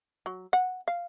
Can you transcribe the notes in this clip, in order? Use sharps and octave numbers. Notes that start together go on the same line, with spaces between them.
F#3
F#5
F5